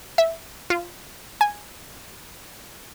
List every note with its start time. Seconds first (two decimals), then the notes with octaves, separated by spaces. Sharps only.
0.18 E5
0.70 F4
1.41 G#5